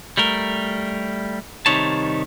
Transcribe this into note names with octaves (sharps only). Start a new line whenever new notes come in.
G3 A3 A#4
C3 D#3 G3 D#4 C#5 A5